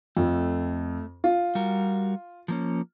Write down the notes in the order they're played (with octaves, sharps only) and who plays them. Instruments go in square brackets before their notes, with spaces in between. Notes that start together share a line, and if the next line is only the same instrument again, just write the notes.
[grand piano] F2 [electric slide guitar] A3
[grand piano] F4
[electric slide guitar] G3 F#4 A#4
F3 A#3 C#4